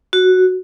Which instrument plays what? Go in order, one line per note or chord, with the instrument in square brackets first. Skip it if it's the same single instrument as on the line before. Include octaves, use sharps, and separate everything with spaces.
[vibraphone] F#4